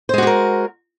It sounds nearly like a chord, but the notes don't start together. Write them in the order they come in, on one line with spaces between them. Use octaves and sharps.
C5 G#3 F#4 G4 A#4